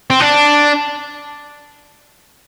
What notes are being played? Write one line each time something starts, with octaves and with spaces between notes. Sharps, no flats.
C4
D4